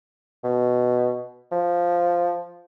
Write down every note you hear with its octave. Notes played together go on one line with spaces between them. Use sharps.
B2
F3